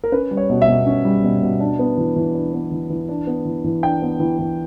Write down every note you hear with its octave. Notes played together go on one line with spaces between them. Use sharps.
A#4
C#4 B4
G3
C#5
B2
E5
B2
C#4
G3
B2
B2
D4
B3
E3
E3
D4
B3
E3
E3
D4
B3
E3
E3
D4 G5
B3
E3
E3